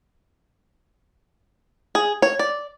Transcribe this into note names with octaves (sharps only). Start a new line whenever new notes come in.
G#4
C#5
D5